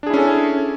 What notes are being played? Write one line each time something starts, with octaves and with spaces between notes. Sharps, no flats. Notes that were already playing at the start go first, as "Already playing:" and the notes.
C#4 D4 E4 G#4 A4